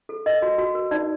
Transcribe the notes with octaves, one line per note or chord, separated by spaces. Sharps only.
A4
A#4 D#5
F#4
F#4
A#4
D#4 D5